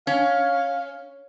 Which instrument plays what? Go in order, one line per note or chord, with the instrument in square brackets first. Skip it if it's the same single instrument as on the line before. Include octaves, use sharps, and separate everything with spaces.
[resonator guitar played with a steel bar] C#4 [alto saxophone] F5